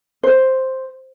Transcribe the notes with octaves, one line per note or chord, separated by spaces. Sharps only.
C5